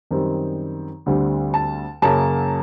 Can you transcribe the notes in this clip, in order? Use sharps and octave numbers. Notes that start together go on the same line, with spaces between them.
F#2 D#3 G3 C4
D2 D3 G3 C4
A5
F#2 C#3 F#3 A#3 A5